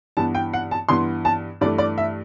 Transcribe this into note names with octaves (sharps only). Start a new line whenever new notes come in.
G2 E3 B3 A5
G5
F#5
A5
G2 E3 B3 C6
A5
G2 E3 A3 D5
D5
E5